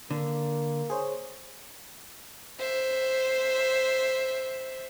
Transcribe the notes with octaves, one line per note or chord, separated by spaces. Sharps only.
D3 A#3
G#4 C5 C#5
C5 E5